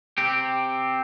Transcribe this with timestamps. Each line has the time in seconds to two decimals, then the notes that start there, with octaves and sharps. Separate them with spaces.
0.18 C4 G4